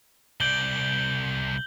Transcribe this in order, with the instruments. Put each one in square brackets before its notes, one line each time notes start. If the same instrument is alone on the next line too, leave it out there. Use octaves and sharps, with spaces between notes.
[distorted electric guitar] C2 D5 [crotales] G6 F#7 G7